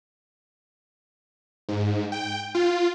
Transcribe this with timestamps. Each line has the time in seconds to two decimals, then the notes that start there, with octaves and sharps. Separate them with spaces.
1.69 G#2
2.12 G5
2.55 F4